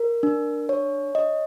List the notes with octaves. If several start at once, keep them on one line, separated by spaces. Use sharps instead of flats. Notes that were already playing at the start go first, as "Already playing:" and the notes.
Already playing: A#4
D4
C#5
D#5